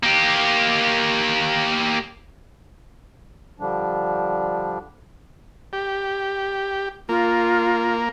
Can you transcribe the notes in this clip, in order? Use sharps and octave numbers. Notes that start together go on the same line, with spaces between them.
A#3 G4
D3 F3 G3 D4
G4
A#3 F4